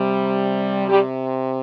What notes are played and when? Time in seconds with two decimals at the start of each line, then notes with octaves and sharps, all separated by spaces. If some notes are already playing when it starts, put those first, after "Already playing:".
Already playing: C3 G3
0.88 G3 G4